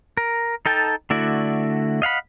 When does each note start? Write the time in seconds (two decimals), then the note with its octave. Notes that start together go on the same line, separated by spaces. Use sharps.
0.17 A#4
0.66 D#4 A4 G5 A5
1.10 D3 A3 E4 F#4 D5
2.02 D#5 F5 F#5 B5